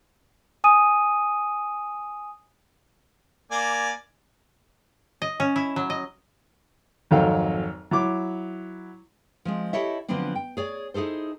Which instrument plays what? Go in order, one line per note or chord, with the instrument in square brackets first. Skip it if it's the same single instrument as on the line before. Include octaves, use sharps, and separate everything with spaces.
[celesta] G#5 D#6 D#7
[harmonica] A#3 D5 G#5
[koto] D#5
C#4
E4
F#3
D#5
[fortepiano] G#1 F2 F#3 A4 F5 G5
F#3 E4 D6
[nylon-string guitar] F3 G#3 C4
E4 G4 A4 C#5 D#5 E5
D3 F3 F#3 B3 C4 D4
G5
G#4 C#5 D5
D#4 E4 G#4 A4 C5